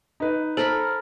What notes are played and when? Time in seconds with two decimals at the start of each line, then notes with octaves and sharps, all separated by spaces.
0.20 D#4 B4
0.57 A4 A#4 C5 B5